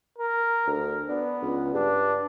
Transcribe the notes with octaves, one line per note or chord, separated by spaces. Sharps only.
A#4
D2
B3 D4
C#2
G2 D4